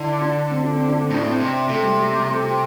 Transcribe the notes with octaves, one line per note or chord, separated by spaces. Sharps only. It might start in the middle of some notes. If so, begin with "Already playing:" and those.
Already playing: D3 E4
D4
C4
D4
C4
D4
C4
A2 D4
C4
C3
C3 A3
G3
G3
G3
A3
G4